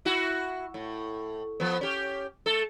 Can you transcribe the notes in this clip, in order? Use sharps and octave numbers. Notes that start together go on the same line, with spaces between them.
E4 F#4
A2
F3 B3
C#4 G4
A3 A4